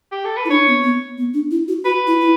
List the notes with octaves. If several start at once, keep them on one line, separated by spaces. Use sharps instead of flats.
G4
A4
B4
E4
D4 C#5
B3
B3
B3
D4
E4
F#4
F#4 B4
E4
E4